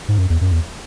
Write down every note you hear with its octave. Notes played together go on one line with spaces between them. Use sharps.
G#2
F#2
E2
F#2
E2